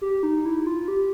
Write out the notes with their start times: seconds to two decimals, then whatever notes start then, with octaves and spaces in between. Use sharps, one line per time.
0.01 G4
0.23 D#4
0.45 E4
0.66 F4
0.88 G4